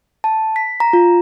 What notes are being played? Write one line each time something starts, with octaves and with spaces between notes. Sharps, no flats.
A5
B6
A#5
F4